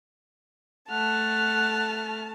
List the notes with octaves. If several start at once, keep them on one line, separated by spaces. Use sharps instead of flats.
A3 F#5 A5 F6